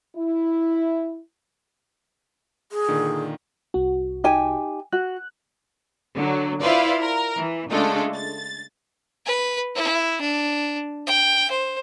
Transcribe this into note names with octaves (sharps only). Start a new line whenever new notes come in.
E4
G#4
A#2 D3 D#3
C2 F#4
D#4 G4 G#5
F#4 F#6
D3 F#3
E4 F4 B4 C5 D5 F5
A#4
E3
C#3 G#3 A3 D4 F4 A4
A6
B4
E4
D4
G5
C5